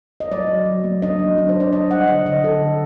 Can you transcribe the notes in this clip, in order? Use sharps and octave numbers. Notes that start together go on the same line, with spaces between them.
D#5
F#3 D5
F#3
F#3
A#3
D4 D#5
F#3
D4
C5
F#3
D5
D4 D#5
G3 F#5
D3 D#5
D3 D#5
D3 A4
D3